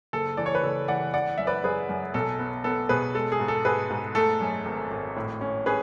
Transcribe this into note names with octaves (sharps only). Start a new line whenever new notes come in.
F#1 A4
E3 D5
C#5
B4
F#1 A4
E3 D5 F#5
E3 D5 F#5
F#2 E5
B4 D5
F#2 G#4 B4
F#2
B1 A4
B3
B3 A4
B2 G#4 B4
G#3 A4
G#4
G#2
A4
G#2 G#4 B4
G#2
A3 A4
F#2
G#1
G#1
A2
C#4
C#4 G#4 B4